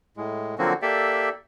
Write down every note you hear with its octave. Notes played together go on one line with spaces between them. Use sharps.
A2 G#3
D3 F3 F#3 A#3 C4 F#4
A#3 G4 A4 D5 E5